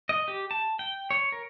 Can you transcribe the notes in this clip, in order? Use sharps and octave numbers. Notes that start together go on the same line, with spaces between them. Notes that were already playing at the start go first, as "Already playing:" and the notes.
D#5
G4
A5
G5
C#5
A#4